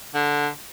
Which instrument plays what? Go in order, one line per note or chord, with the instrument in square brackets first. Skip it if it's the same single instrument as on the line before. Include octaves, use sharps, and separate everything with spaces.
[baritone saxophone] D3